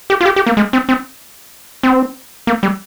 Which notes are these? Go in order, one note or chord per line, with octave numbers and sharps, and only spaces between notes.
G4
F4
G4
G4
A#3
G#3
C4
C4
C4
A#3
G3